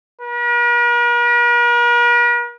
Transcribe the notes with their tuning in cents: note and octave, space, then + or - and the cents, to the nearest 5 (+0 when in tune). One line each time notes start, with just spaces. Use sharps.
A#4 +45